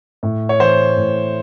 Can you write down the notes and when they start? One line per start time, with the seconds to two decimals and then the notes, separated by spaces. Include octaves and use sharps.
0.23 A2
0.49 C#5
0.60 E3 C5
0.97 A2